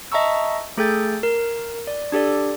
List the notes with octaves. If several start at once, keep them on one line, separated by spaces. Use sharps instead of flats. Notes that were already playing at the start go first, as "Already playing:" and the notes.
D#5 E5 A5 A#5 C#6 E6
A3 G#4 A4 G5 G6 A6
A#4
D5
D4 G4 A4 D5